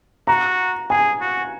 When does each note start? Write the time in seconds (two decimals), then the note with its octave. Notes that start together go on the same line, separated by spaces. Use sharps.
0.27 F#4 A#5
0.90 G#4 G#5
1.21 F#4